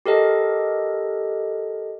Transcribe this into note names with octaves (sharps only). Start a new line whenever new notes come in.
G4 A4 A#4 D#5